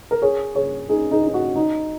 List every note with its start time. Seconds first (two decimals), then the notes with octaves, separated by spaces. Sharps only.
0.11 A#4
0.22 G#4 C#5
0.55 G#4 C#5
0.89 D#4 G#4
1.11 D#4 G#4
1.27 D#4
1.34 F#4
1.56 D#4